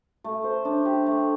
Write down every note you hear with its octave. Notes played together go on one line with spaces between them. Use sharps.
A3
C5
D4
G4
A3